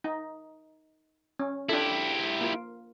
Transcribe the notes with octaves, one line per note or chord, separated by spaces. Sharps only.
D#4
C#4
D4 E4 F4 G4 A4
A#3 F4